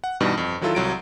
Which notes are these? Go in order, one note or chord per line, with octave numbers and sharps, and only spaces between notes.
F#5
G2 B2 E3 G3 D4 D#4
F2
D#3 F#3 E4 F4 A4
C2 F#3 D7